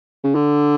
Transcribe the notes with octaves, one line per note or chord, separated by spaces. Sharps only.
C#3
D3